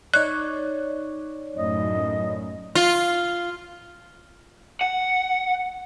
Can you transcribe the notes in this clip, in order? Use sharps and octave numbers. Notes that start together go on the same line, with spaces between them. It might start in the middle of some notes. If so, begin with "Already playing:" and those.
D#4 C#5 D5 F#6
F#2 A2 D#5
F4
F#5